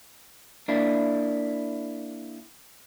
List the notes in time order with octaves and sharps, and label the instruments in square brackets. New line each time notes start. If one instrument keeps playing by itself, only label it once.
[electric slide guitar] A#3 D4 E4